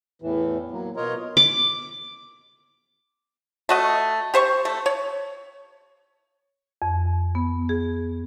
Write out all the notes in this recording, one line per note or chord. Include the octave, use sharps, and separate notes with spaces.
E2 A2 E3
F#3 A#3
B2 F4 A#4 C#5 D#5 A#5
D6
A3 F#4 D#5
G4 C5 C#6
A3
C#5
F2
B3
G#4